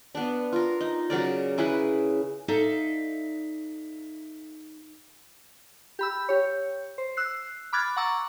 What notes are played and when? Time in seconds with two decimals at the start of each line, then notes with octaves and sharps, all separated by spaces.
0.15 B3 D4
0.53 F4 A#4
0.81 D#4
1.10 C#3 F#3 A#4 D5
1.58 C#4 E4 G#4 B4
2.48 D#4 A4 D5 E5 F5
5.99 G4 B5 E6
6.29 G4 C#5
6.98 C5
7.17 E6 F#6 C7
7.73 B5 D6 F6 F#6 G#6 A6
7.96 F#5 A#5 C#6 D6 E6 A6